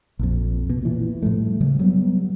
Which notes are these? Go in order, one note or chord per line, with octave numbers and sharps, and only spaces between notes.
A#1 F2
B2
A#2 E3
A2 F3 G3 A3
C#3 G3
F#3 G3 B3